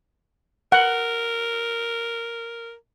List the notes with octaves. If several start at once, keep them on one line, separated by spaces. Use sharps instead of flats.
A#4 F#5